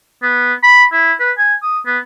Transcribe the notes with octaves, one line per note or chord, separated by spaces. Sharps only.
B3
B5
E4
B4
G#5
D#6
B3